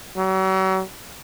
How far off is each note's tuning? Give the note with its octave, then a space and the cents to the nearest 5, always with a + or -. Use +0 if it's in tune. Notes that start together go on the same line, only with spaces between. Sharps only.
F#3 +40